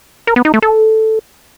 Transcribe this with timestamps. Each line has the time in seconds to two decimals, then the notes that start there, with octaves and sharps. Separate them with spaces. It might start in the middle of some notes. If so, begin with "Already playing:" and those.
0.27 A#4
0.36 B3
0.45 D#4
0.54 A3
0.62 A4